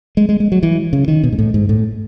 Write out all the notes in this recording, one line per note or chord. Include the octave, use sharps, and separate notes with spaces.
G#3
G#3
G#3
F#3
E3
C#3
D#3
B2
G#2
A2
G#2
A2